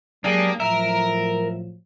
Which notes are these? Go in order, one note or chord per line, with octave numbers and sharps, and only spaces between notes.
F#3 G#3 A#3 D4 G4 G#4
A2 F3 F#3 A#4 E5